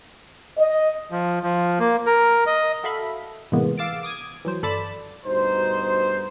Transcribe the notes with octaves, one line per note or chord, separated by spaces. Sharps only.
D#5
F3
F3
A#3
A#4
D#5
F#4 A4 E5 F5 B5
A2 C3 E3 G#3 A#3 B3
F5 D6 E6 A6 C7 D7
D6 D#6 G#6
E3 F#3 C5
G1 A4 D5 B5 A6 E7
D2 G2 B2 D#4 C5